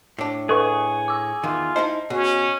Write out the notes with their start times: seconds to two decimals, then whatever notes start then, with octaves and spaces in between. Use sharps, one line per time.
0.18 A2 D4
0.49 G#4 A4 B4 C#6
1.08 D6 E6
1.44 E2 D#3 F4
1.76 D#4 E4 C5 D#5
2.10 B2 C#4 G#4